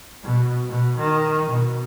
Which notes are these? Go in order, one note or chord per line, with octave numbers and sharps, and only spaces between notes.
B2
B2
D#3
B2